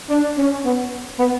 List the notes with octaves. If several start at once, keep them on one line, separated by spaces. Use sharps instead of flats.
D4
C#4
B3
B3